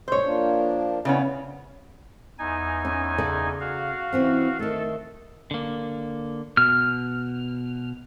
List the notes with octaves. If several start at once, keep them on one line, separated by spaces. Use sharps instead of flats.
F#2 A#2 G#3 C5 C#5
F3 A#3 D4
C#3 B3 C#4 D4 E4 C#5
E2 D#4 G#5
C#4
C#3 A4 D5
F#4 F5
E3 C4 C#4
D#3 A3 A4
D3 A#3
B2 F6